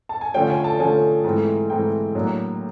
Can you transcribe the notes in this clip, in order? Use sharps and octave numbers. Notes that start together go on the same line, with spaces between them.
A5
G#5
D3 F3 A3 C#4 G5
G#5
A5
D3 F3 A3 C#4 G#5
G#2 E3 A3 C4
G#2 E3 A3 C4 G5
A2 F#3 A#3 D4